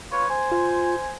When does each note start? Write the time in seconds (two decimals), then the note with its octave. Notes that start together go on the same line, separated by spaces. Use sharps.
0.12 F4 B4 C#5
0.29 C5 G#5
0.52 F4